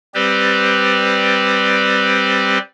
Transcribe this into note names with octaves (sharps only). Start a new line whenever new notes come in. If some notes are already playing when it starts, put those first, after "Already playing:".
G3 C4 G4 B4 C5 D5